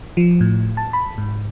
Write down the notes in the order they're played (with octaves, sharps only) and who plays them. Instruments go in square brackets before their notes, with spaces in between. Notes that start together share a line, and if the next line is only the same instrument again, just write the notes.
[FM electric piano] F3
A2
A5
B5
G#2